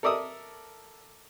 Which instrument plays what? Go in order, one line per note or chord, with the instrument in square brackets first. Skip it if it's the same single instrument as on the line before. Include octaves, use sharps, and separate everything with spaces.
[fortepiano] A4 A#4 D5 E5 D#6